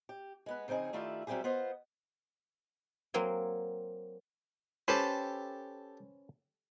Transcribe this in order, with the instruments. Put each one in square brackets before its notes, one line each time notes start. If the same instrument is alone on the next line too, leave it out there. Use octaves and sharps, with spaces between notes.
[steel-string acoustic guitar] G4
G#3 B3 B4
C#3 F3 C4 D#4 G#4
D#3 A3 E4 F4 G4 D5
F#3 G3 C4 E4 G4 G#4
B3 F4 C5 D#5
[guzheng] F#3 A#3 C4 G#5
[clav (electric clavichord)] C#4 B4 C5 [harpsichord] G4 A4